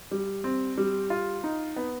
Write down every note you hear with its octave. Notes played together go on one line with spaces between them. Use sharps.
G3
C4
G3
F4
D#4
B3